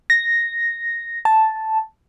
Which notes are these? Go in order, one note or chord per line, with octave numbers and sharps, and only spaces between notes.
A#6
A5